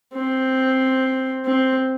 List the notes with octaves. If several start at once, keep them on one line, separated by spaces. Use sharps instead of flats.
C4
C4